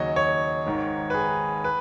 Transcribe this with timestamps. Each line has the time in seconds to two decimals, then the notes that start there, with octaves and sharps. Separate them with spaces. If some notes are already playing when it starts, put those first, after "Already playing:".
Already playing: D#2 C#3 F#3 C#5 D#5
0.16 C#5
0.66 G#1 G#2 D#3
1.10 B4
1.14 G#4
1.64 B4